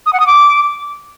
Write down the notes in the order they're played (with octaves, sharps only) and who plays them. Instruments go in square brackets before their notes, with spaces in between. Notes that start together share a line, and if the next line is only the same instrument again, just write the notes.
[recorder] D#6
F#5
D#6
D6